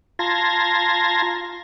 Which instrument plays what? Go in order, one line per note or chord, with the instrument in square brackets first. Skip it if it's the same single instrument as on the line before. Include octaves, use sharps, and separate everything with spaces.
[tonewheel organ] F4 A5 A#5 C6 G#6 A#6